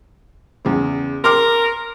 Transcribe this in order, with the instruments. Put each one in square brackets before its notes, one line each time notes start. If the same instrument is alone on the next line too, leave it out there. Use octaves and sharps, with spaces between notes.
[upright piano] E2 C#3
[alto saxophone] A#4 [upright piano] C6 D6 F6